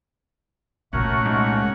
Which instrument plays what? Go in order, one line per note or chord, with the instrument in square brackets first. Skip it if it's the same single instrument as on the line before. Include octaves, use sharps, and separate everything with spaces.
[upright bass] C2 A#2 [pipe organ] A3 F#4 A#4 [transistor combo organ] C#4 F#5
[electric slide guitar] G#2